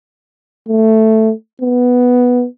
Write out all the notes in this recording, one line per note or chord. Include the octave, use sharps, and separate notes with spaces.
A3
B3